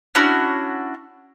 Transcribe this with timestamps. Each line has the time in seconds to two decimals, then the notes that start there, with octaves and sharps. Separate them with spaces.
0.15 C#4 D4 E4 F#4